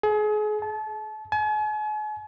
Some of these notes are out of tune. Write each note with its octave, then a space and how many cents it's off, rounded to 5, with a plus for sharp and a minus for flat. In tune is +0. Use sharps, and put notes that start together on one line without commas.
G#4 +35
A5 -30
G#5 +40